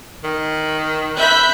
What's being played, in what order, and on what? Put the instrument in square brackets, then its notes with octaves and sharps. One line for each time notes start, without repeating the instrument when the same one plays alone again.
[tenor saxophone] D#3
[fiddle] E5 B5 [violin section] F#6 G6